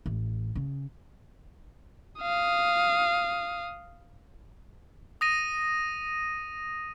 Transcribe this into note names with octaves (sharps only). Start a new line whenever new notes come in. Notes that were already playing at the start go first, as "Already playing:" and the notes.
A1
C#3
F5 D#6
D#6 A#6 D#7